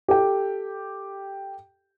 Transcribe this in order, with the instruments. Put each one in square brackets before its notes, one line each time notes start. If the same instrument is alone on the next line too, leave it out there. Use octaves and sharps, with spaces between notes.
[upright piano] G4 A4 G5